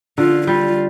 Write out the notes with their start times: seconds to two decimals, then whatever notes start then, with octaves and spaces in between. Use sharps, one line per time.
0.18 D3 F4
0.47 G3 F4